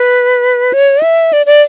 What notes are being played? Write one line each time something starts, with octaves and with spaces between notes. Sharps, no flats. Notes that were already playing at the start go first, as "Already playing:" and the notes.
Already playing: B4
C#5
E5
D5
D5